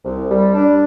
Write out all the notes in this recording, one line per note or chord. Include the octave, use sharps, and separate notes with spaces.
C2
G3
D4